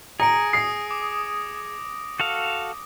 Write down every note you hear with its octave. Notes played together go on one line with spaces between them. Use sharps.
G#4 A#5 A#6 C#7 D7
D#6 C7
D6
F#4 A4 F5